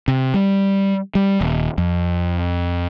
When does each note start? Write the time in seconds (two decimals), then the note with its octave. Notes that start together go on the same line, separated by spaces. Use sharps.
0.08 C3
0.34 G3
1.15 G3
1.41 D#1
1.78 F2